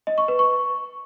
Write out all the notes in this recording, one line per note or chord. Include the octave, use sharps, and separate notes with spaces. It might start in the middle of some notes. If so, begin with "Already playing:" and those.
D#5
C#6
B4
C#6